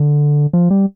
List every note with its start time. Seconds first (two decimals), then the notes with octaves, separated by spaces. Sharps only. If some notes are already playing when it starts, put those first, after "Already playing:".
Already playing: D3
0.53 F3
0.71 G3